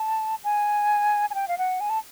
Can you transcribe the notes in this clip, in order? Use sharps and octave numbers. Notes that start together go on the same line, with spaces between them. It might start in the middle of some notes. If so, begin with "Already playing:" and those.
Already playing: A5
G#5
G#5
G5
F5
F#5
G#5
A5